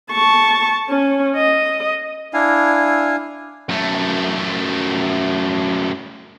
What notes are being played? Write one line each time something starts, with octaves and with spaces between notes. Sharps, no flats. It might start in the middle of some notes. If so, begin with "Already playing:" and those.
A5 C#6
C#4
D#5
D4 E4 F5 G#5
F#2 A3